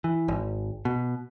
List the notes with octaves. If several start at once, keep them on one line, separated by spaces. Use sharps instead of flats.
E3
G#1
B2